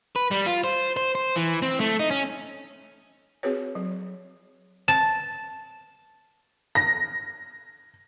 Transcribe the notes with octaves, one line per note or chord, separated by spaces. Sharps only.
B4
G3
F4
C5
C5
C5
E3
C4
A3
D#4
C#4
C4 F#4 G#4 B4 C#5
F#3
A5
A#6